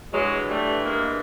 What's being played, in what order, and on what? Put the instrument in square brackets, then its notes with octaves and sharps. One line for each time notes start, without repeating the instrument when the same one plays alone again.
[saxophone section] G2 E3 F#3 G#3
G3 A3
G#3 A#3